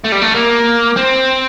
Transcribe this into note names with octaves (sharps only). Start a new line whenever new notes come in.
A3
G3
A3
A#3
C4